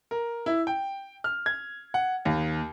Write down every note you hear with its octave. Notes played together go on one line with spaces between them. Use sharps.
A#4
E4
G5
F6
G#6
F#5
D#2